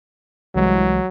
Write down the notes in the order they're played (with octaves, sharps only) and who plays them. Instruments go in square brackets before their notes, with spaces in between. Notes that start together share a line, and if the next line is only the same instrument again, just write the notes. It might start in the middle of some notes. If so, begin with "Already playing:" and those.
[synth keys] C2 E3 G#3 [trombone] F#3